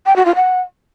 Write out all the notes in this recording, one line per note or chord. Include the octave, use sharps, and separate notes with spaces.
G5
F#4
F4
F#5